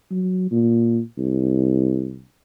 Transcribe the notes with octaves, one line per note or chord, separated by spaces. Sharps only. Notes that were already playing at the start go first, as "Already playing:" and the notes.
F#3
A#2
C2